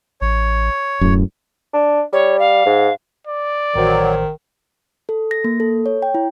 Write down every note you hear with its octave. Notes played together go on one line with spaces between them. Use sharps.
A1 C#5
D1 F#2 A2
D4
G3 C#5
F5
G#2
D5
A1 D#3 F#3 C5
A4
A#6
A#3
A4
C#5
G5
E4